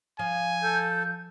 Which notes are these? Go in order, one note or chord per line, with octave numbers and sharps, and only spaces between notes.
F3 G#5
A4 G6